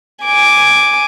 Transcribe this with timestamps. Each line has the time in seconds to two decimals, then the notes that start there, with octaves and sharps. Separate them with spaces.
0.24 G#5 D6